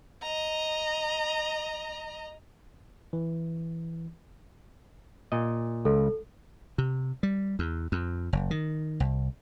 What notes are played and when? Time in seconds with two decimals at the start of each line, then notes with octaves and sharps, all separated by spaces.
0.22 D#5 A#5
3.13 E3
5.32 A#2 D#5
5.85 C#2 A4
6.78 C3
7.23 G3
7.59 E2
7.92 F2
8.33 F#1
8.51 D#3
9.00 C2